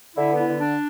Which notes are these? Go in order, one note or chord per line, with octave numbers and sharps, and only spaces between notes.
D3 E4
B3
E4
D3
D4